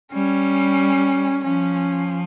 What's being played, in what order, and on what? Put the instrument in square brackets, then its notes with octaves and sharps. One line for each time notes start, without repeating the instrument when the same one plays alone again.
[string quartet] G3 [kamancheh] C#4
[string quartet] F3 [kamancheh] C#4